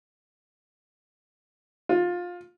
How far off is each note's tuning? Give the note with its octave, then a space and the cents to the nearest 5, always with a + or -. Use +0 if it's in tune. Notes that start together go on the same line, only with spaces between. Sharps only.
F4 +20